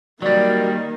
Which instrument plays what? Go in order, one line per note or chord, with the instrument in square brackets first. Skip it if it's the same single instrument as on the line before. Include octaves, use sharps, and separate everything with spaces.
[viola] D#3 A#3 [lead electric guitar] F#3 G3 [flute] D5